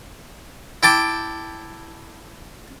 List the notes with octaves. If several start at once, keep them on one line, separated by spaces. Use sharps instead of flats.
E4 G5 A5 D6